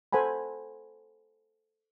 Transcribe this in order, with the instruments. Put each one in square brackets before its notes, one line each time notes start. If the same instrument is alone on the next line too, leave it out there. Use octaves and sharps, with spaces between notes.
[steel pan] A4 C5 F#5 G#5 B5